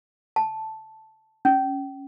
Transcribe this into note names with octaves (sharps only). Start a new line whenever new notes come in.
A5
C#4